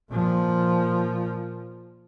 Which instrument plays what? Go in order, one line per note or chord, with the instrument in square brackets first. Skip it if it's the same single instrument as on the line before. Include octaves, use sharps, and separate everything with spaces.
[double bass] A#2 F3